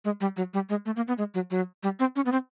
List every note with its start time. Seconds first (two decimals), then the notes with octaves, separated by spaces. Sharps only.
0.05 G#3
0.21 G3
0.37 F#3
0.54 G3
0.70 G#3
0.86 A3
0.96 A#3
1.08 B3
1.18 G#3
1.34 F#3
1.51 F#3
1.83 G3
2.00 C4
2.16 C#4
2.26 B3
2.32 C4